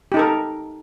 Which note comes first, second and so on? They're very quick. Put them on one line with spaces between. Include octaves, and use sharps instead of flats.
G4 D#4 A4 A#4